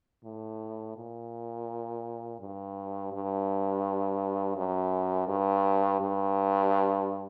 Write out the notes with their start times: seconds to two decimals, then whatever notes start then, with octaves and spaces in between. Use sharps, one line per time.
0.24 A2
0.96 A#2
2.40 G2
3.12 G2
4.56 F#2
5.28 G2
6.00 G2